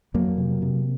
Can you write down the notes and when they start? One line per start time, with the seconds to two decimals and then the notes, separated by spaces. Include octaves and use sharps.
0.14 F2 F#3 A#3
0.38 C3
0.62 C3